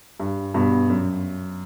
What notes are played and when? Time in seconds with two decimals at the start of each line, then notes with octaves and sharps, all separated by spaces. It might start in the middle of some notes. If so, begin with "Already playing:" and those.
0.20 G2
0.54 G2 B2
0.89 F#2